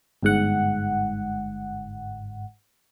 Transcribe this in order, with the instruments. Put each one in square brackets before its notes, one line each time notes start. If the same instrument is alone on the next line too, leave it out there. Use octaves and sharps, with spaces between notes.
[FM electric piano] G1 G#2 F#5